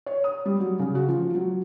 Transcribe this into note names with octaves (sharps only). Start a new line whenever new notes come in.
C#5
D#6
G3
F#3
C#3
F#4
F3
F#3